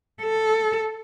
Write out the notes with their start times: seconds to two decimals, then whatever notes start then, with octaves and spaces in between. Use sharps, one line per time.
0.22 A4